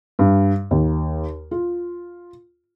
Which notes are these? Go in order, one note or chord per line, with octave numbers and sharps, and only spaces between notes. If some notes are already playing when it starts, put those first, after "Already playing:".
G2
D#2
F4